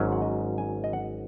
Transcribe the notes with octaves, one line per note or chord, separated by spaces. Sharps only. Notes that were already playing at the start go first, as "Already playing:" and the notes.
Already playing: G#1 G#2 F#3 C#4
F#5
D#5
G#5
D#5
F#5